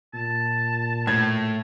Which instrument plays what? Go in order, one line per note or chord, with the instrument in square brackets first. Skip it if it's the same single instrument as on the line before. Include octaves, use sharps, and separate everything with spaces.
[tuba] A#2 [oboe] A5
[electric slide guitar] A2 [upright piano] G#6